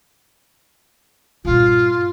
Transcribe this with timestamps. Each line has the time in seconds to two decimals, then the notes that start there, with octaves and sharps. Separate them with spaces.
1.45 G2 A#2 F4